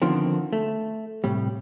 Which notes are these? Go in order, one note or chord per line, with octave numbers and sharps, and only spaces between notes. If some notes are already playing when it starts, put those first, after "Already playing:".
D3 D#3 F3 B3 C4
A3
A2 C3 G3